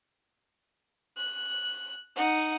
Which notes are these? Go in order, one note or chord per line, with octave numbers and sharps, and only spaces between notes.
F#6
D#4 F#5